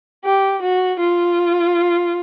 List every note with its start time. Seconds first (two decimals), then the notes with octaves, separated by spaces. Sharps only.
0.24 G4
0.62 F#4
1.01 F4